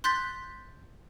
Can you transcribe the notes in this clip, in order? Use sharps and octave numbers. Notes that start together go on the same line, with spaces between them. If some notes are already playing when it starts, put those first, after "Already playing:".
C6 F#6 G6 A6 B6